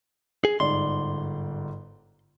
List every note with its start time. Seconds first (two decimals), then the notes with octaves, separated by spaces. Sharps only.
0.45 G#4
0.60 G1 G#2 D5 C6